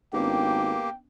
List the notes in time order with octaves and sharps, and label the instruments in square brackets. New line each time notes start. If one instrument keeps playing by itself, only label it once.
[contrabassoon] G#1 [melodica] A#3 G4 [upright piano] B3 C#4 D4 [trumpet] G5